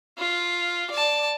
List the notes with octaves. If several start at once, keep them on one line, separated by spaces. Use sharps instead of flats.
F4
D5 A5